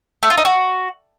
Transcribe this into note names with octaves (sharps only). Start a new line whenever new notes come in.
A3
F4
D#4
F#4